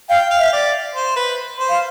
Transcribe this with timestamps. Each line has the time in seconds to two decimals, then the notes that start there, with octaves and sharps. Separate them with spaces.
0.09 F5 G5
0.31 F5
0.39 E5
0.53 D5
0.95 C5
1.16 B4
1.59 C5
1.69 F5